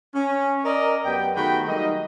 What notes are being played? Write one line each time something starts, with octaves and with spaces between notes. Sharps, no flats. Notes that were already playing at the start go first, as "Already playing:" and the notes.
C#4
A#4 D5 D#5
F#2 B3 G4 G5
D#3 A3 F#4 G#4 G5 B5
F#3 G3 A#3 D#4 D#5